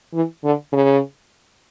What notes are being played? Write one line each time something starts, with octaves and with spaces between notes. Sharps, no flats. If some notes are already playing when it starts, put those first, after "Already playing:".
E3
D3
C#3